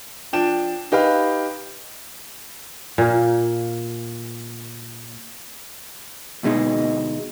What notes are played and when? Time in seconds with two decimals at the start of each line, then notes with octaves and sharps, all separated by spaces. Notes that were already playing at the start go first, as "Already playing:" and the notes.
0.33 F3 D4 G5 E7
0.92 D#4 G4 B4 F5
2.98 A#2 A#3
6.43 D2 B2 G#3 D#4